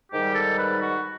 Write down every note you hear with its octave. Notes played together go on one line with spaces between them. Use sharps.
G#2 D#3 G3 G4
A4
B4
F#4